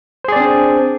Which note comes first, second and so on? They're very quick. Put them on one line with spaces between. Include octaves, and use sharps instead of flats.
C5 G#4 D5 C4 D4